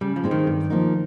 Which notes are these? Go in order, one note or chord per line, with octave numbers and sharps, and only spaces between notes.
C#3 G3
F3
G#3 C4 D#4
D#3
G2
F3 A#3 D#4